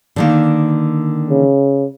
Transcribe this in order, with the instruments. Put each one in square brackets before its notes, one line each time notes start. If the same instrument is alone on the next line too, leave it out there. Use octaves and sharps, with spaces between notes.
[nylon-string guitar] D3 D#3 A#3
[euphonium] C#3